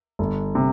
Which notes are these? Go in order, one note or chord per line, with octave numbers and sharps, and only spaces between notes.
G1
C3